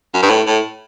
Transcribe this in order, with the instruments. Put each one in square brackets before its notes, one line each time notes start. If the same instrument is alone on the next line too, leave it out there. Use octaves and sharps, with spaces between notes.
[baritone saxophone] F#2
G2
A2
A2